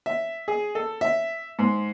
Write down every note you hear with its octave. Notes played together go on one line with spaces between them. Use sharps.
E5
G#4
A4
E5
G#2